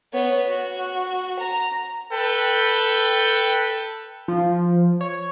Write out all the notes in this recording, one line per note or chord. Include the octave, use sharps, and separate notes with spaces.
B3 C#5
F#4
A#5
A4 B4 G5
F3
C#5